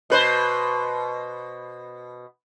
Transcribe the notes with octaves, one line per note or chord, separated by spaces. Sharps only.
B2 B4 C5